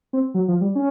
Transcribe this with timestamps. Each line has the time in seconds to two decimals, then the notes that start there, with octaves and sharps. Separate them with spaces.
0.13 C4
0.34 F#3
0.48 F3
0.61 G3
0.75 C#4